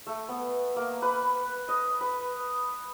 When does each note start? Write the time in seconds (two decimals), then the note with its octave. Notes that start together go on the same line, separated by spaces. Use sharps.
0.07 A3
0.29 B3
0.76 A#3
1.02 B4
1.68 D#5
2.01 B4